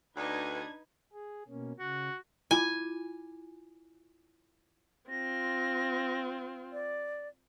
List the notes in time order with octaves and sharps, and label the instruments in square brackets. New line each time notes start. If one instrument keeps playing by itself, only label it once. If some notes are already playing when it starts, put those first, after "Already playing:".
[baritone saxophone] D2 [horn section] D4 [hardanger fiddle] D#4 D#5 [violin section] B4 G#6
[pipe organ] G#4
B2 A#3 C#4
[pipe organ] C#3 [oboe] F#4
[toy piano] E4 F4 D6 [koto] G#5
[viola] C4 F4 [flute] A#6
[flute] D5